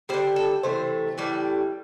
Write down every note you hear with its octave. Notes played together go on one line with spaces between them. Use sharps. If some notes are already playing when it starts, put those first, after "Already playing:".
D3 G3 C5
A4
C3 E3 A3 C5
A2 E3 G3